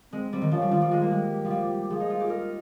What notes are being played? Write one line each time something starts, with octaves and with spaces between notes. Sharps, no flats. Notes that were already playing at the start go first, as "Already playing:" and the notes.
G#3 C4
G3 C4
D#3
F3 C#4
G3
F3 F4
G3
G#3 F4
A#3
G#3 G4
F3
G3
F3 G#4
D#4
F4
G4
D#4 A#4